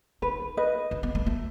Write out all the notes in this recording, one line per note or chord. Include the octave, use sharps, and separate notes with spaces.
D#4 B4
B4 D#5
D#4
B3
A3
A3